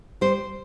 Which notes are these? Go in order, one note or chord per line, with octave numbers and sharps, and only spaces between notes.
G3 C5